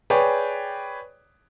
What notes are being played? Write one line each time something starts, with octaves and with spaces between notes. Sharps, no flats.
G#4 B4 C#5 D5 G5